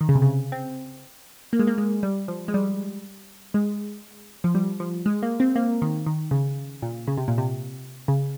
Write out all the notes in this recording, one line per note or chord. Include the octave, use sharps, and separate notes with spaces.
D#3
C#3
C3
C#3
C4
A#3
G#3
A#3
G#3
G3
F3
G#3
G3
G#3
F3
G3
F3
G#3
A#3
C4
A#3
D#3
D#3
C#3
A#2
C#3
C3
A#2
C3
C#3